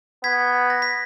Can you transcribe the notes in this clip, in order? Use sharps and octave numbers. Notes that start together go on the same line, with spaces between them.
B3 G#6 B6
A#6
B6